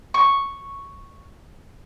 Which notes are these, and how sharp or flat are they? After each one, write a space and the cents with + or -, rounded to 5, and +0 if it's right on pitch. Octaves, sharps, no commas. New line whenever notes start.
C#6 +0